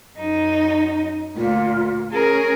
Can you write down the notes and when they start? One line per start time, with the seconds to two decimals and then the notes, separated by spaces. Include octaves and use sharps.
0.19 F#2 D#4
1.36 D2 A#2 F4
2.12 C#4 G#4 A#4